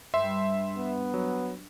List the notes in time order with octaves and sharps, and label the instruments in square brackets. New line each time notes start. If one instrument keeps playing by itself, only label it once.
[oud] G2 [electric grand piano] E5 C6
[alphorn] B3
[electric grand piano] F#3